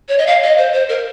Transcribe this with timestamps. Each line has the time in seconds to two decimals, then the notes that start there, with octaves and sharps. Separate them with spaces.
0.09 C#5
0.18 D#5
0.27 F5
0.43 D#5
0.58 C5
0.73 C5
0.89 A#4